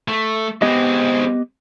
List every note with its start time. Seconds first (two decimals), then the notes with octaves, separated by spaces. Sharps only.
0.08 A3
0.62 G#3 B3 C4 G4 D#5